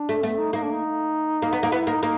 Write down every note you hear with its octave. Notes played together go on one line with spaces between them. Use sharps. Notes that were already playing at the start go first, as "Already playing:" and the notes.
Already playing: D4
A3
A3 B3
D#4
A#3 D#4
D4
D#4
A#3
B3
A#3
B3 E4
A#3 D#4
A#3 D#4